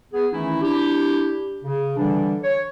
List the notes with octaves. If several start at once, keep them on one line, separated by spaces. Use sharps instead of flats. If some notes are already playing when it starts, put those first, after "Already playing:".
B3 G#4
D#3 E3 A3 C#4 D#4 E4
D4 E4 G4
C#3
D3 E3 G3 D4
C#5